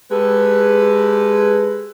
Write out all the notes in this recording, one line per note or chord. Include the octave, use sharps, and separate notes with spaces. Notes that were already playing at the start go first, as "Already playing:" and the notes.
G#3 G4 A4 B4